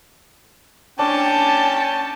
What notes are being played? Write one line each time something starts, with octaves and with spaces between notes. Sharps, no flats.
C#4 D4 G5 A5